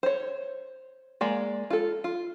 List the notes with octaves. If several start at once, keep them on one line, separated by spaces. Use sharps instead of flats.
C5 C#5
G#3 A#3 D5
F4 A4
F4